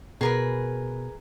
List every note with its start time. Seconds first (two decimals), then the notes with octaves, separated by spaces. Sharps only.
0.21 B2 G#4 A#4 B4